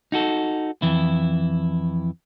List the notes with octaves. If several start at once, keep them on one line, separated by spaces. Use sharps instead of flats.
D#4 F#4 A4
F2 E3 E4